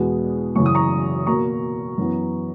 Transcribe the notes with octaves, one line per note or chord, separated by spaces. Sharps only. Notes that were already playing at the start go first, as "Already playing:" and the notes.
Already playing: E2 B2 G#3 B3
F#2 C#3 E3 C#6
D#6
A#5 C#6
B2 A#3 A#5 C#6
F#2 E3 B3